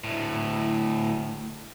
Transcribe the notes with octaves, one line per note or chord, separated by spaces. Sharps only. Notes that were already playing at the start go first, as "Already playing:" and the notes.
D2 A2